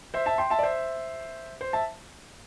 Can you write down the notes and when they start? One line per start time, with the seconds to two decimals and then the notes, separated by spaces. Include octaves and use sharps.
0.14 C5 E5
0.26 E5 A5
0.38 G5 C6
0.50 E5 A5
0.59 D5
0.63 C5 E5
1.61 C5
1.73 E5 A5